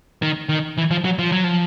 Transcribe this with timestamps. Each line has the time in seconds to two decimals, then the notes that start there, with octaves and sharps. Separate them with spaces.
0.22 D#3
0.49 D#3
0.78 E3
0.91 F3
1.04 F#3
1.19 F3
1.32 F#3
1.44 F3